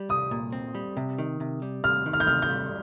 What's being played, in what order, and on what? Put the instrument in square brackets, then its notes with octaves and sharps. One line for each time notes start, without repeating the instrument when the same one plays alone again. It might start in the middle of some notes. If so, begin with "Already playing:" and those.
Already playing: [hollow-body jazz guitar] G3
[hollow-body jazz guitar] C2 [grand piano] D#6
[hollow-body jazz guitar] A#2
C4
G3
C3
D#3
C3
G3
[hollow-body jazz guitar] C3 [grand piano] F6
[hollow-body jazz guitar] D#3
[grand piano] F6
G6
[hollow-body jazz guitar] C3 [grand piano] F6
[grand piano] G6
[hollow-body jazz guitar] G3